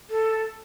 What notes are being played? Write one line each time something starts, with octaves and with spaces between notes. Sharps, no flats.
A4